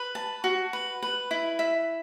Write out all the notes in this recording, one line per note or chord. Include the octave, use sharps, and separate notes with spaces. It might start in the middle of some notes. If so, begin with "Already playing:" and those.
Already playing: B4
A5
F#4
B4
B4
E4
E5